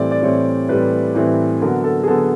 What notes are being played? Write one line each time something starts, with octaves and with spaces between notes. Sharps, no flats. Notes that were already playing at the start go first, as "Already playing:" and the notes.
Already playing: A2 E3 G3 C4 D5
D5
A2 E3 G3 C4 C#5
A2 E3 G3 C4 B4
A2 E3 G3 C4
D3 F#3 B3 A#4
A4
G#4
D3 F#3 B3 A4